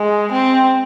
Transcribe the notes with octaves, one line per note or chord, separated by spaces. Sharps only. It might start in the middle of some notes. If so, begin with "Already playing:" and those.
Already playing: G#3
C4